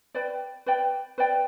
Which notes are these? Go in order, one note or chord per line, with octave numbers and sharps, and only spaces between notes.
B4 D5 G5
B4 D5 G5
B4 D5 G5